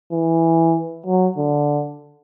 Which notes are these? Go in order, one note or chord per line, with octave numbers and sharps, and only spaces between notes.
E3
F#3
D3